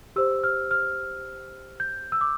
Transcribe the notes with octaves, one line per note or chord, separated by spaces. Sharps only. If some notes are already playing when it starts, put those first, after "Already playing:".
G4 C5 E6
F6
F6
G6
E6
D6